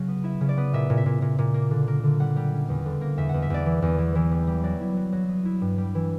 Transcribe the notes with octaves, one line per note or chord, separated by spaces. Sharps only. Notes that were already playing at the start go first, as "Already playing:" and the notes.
Already playing: C#3 F#3
B3
E4 E5
C#3
D5
B3
A#2 E5
A#2
E5
A#2
A#2
A#2
A#3
D3
A#3
D3
G3 F#5
G3
C#4
E2
D3
A#3
E2 E5
E2 F#5
E5
E2 D5
E3
E2
E3
E3
G3
G3
F#3 D5
E4
F#3
F#3
B3
E4
G2
G3
E3